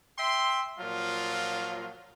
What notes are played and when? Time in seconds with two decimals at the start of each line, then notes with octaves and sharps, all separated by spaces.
0.19 E5 G5 C6
0.80 A#2 F3 F#3 F4